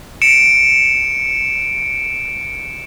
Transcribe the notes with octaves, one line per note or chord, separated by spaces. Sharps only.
C#7 D7 E7